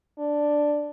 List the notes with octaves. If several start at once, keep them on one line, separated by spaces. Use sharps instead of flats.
D4